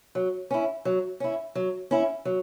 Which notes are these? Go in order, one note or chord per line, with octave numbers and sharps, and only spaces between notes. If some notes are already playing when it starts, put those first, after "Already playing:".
F#3
C#4 E4
F#3
C#4 E4
F#3
C#4 E4
F#3